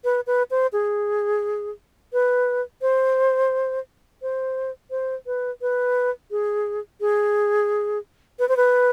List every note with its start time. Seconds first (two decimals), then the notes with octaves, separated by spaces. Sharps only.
0.04 B4
0.27 B4
0.51 C5
0.73 G#4
2.13 B4
2.82 C5
4.22 C5
4.91 C5
5.26 B4
5.62 B4
6.31 G#4
7.01 G#4
8.39 B4
8.49 C5
8.57 B4